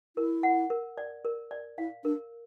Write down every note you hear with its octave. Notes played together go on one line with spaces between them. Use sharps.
E4 A#4
F#5
A#4
D5
A#4
D5
E4 F5
D4 A#4